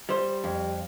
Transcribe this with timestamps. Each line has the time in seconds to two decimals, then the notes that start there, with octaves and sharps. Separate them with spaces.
0.09 G3 C5
0.44 F2